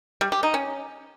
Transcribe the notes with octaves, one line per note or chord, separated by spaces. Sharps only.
G3
G4
D#4
C#4